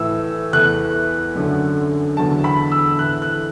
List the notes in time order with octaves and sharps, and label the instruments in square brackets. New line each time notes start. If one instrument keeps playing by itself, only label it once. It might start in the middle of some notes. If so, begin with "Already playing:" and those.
Already playing: [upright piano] A2 E3 A3 E6
E2 E3 A3 F#6
F#2 D3 F#3 A3
E2 D3 F#3 A3 A5
B5
E6
A2 E3 A3 F#6
F#6